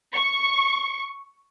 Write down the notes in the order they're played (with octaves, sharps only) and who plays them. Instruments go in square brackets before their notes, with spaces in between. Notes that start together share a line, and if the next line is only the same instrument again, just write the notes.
[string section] C#6